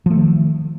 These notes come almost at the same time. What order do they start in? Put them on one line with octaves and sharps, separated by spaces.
F3 A3 D#3